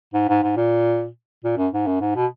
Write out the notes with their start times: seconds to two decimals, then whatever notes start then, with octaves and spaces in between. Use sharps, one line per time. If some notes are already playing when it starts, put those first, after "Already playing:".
0.14 G#2
0.29 G#2
0.43 G#2
0.57 A#2
1.44 A#2
1.58 F#2
1.73 G#2
1.87 F#2
2.01 G#2
2.15 B2